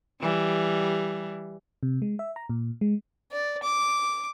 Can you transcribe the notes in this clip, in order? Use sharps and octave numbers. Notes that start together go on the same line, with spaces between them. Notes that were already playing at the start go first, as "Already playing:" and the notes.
E3 G3
C3
G#3
E5
A#5
A#2
G#3
D5
D6